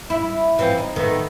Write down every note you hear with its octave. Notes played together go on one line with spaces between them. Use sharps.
E4
E3 F3 C4
D#4
D#3 A3 B3